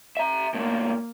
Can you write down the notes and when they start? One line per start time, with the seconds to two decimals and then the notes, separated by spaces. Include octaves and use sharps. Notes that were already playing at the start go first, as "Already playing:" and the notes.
0.17 E5 A#5
0.54 B2 A3 A#3